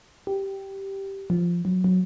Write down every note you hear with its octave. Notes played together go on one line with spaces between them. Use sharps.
G4
F3
F#3
F#3